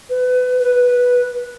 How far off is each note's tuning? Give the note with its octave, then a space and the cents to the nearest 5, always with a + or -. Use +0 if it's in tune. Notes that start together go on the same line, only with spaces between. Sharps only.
B4 +25
B4 -5